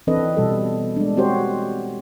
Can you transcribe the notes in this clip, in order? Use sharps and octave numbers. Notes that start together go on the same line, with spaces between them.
E3 C4 D4 A4 B4 D#5
B2 G3 A4
G#3 D4
C4 F#4 G4 C5 C#5